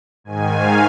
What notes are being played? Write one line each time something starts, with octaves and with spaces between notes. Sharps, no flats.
G#2 D#3 G#5
F5